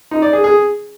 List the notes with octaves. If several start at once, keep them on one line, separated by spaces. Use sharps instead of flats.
D#4
D5
G#4
G#4